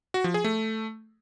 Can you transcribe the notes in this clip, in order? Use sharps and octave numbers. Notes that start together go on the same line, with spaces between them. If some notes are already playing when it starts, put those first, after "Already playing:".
F#4
F3
G#4
A3